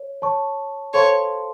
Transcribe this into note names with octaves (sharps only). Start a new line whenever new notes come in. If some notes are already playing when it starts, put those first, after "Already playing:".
Already playing: C#5
C#5 A5 C#6
A4 C5 C#5 F5 A5 C6